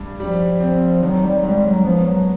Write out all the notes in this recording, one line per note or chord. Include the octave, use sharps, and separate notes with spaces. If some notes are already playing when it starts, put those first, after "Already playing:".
Already playing: G2
F3 G3
C4
D#3 F#3
G3
F#3
G#2 G3
F#3
F3 B3
F#3